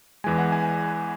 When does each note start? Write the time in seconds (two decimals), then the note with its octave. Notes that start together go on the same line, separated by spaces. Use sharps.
0.24 E2 E3 G#3 G#5
0.38 F#5
0.52 G#5